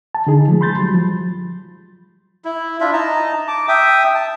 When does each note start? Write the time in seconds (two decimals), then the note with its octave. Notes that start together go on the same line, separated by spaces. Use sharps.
0.15 A5
0.27 D3 D#4 G#4
0.48 F3 G#3
0.61 B5 C6 G6 A6
0.78 F#3 G3
0.94 F3
2.45 E4
2.80 D4 E4 F4 E5
2.93 D#4 A5 A#5
3.48 A5 D6
3.68 E5 G5 D#6
4.15 A5